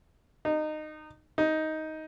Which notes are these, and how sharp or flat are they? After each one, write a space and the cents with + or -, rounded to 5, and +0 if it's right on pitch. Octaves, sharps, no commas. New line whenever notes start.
D#4 -20
D#4 +10